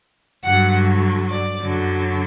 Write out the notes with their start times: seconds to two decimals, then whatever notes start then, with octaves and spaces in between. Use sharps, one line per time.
0.43 G2 D3 F#3 F#5
1.30 D5
1.59 F#2 D3 F#3